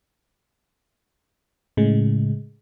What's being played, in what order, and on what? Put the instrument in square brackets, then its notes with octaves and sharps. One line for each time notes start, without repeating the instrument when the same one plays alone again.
[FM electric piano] A2 C#3 G#3